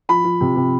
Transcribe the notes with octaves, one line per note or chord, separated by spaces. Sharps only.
F3 B5
F3
C3
C3